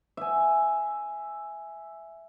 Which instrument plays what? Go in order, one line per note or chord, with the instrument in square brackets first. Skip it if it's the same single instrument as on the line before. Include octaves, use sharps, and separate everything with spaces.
[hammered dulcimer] E5 G#5